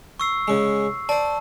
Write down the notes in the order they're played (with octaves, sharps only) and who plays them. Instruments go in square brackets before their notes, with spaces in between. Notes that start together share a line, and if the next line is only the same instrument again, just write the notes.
[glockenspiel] C#6 E6 C7
[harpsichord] C#3 G#3
[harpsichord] C5 D5 [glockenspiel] A5